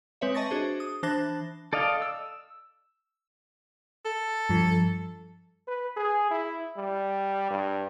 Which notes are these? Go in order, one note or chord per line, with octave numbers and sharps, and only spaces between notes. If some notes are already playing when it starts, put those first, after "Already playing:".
G#3 C4 B4 C#5 E5
D#5 A5 C#6 A6 A#6
D4 F#4 G#4 C5
D#6
E3 D4 C5 A5 F#6 A#6
A4 D5 D#5 F5
E6
A4
G2 F3
B4
G#4
E4
G3
G2